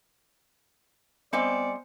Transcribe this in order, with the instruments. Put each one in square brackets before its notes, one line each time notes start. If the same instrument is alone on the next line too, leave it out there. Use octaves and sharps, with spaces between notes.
[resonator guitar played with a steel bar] G3 C4 D#5 [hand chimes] B3 C5 [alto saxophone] D5 [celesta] G#5 C#7